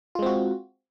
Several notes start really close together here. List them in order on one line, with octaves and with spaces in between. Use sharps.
F4 G#3 C4 F#4